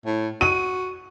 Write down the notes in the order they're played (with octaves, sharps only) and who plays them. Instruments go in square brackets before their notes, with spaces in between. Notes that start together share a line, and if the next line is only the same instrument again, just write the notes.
[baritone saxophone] A2
[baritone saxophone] F#4 [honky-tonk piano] D#7